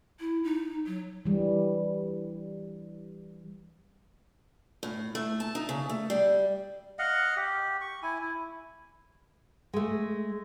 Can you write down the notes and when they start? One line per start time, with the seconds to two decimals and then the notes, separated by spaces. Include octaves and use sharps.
0.20 E4
0.44 D#4
0.86 F#3
1.26 E3 G3
4.83 A2
5.15 A3
5.40 A5
5.55 D#4
5.69 C#3
5.89 A3
6.10 G3
6.99 D#5 F5 F#5
7.37 G4
7.81 C#6
8.03 E4 G#5
8.21 E4
9.73 G#3 A3